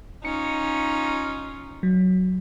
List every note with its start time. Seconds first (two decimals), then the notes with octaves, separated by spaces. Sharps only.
0.25 C#4 D#4 F4 C#7
1.83 F#3